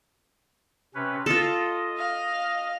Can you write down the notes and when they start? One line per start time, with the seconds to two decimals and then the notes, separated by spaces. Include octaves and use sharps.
0.95 C3 C#4 B4
1.26 F4 A4 D#5
1.98 F5